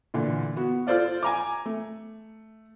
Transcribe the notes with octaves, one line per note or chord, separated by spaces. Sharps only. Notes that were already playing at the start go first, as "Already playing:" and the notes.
A#2 D3 E3
B3 F#4
F4 A4 C5 D5 F5
G#5 A#5 D6
A3